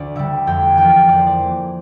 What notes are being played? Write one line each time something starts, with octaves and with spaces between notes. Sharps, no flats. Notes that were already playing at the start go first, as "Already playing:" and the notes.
Already playing: D2 D5
D3 G3 E5
F2 G5
E3 A#3 G5
F2 D5
C5
D5
E3 A#3